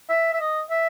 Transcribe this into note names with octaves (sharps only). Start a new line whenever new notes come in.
E5
E5
D#5
E5